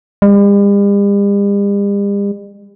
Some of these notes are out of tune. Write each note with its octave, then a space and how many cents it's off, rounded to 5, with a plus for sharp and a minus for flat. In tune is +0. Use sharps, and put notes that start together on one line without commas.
G3 +45